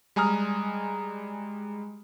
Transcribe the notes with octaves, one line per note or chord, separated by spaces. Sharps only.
G3 G#3 G#5 A#5 D#6 F6